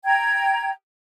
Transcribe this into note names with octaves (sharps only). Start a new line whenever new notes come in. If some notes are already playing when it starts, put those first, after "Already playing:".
G5 A#5 G#6